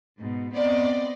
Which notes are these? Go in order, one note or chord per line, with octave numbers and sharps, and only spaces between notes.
G#2 B2
B3 C4 D5 D#5